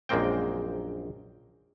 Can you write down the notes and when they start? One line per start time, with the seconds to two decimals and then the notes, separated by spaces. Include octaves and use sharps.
0.09 A#1 F#2 G#3 A#3 C4 G5